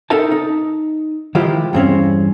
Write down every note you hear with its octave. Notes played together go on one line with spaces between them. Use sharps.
D#4 A4 A#4 E5 A5
D#4
D#3 F3 G#3 E4 F4 G4
E2 G2 C4 C#4